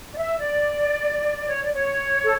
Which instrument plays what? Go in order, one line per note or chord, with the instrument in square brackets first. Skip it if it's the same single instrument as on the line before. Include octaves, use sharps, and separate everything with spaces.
[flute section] D5
E5
D5
C#5
D5
C#5
A4